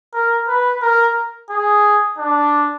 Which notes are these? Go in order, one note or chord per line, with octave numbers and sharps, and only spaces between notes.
A#4
B4
A#4
G#4
D4